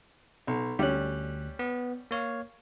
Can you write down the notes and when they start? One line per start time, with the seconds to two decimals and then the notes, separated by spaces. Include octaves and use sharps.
0.47 B1
0.79 D2 G3 C#4 F#6
1.59 B3
2.11 A#3 C#5 F5